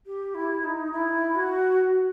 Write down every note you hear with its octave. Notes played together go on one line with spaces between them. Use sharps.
G4
E4
D#4
E4
F#4